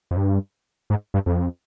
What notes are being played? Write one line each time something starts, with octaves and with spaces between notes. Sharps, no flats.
F2
G2
G#2
G2
F2